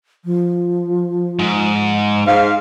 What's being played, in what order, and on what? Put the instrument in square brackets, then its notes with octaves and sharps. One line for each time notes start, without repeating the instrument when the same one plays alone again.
[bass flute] F3
[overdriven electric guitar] G#2
[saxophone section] G#2 F5 [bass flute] C5